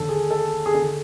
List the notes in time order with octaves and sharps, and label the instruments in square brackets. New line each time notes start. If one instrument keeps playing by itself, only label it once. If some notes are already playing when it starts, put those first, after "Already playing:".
Already playing: [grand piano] D#2 D3 A4
G#4
A4
G#4
D3 A4